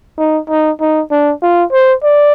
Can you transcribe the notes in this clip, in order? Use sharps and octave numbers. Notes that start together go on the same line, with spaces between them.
D#4
D#4
D#4
D4
F4
C5
D5